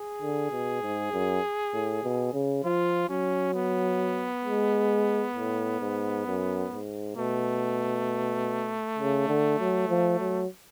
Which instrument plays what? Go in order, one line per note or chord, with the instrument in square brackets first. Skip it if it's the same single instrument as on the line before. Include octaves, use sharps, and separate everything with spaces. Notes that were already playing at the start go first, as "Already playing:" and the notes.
Already playing: [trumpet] G#4
[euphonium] D3
B2
G#2
F#2
A2
B2
C#3
[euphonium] F3 [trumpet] F4
[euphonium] F#3 [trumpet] C#4
[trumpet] B3
[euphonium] G#3
A2
G#2
F#2
G#2
[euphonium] B2 [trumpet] A3
[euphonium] C#3
D3
F#3
F3
F#3